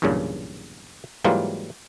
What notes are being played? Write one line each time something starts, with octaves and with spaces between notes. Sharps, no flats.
B1 E2 G2 A#2 C#3
G#2 E3 F#3 G3 A#3 F4